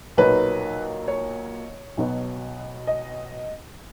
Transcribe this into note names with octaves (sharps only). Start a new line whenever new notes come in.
B1 A#2 F#3 A#3 D#4 B4
C#5
B1 B2 F#3 B3
D#5